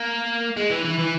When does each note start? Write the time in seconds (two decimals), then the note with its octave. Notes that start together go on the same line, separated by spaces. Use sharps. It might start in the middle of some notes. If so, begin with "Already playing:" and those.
Already playing: A#3
0.57 G#3
0.70 E3
0.85 E3
0.98 E3